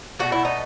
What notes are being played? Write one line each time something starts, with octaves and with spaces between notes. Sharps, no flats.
B2 A3 F#4
E4
D#4